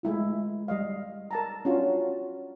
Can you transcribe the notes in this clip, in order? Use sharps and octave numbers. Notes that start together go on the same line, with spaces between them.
G#3 A3 E4 F4
G3 D#5 F5
A#4 A5 A#5
C#4 D4 F4 F#4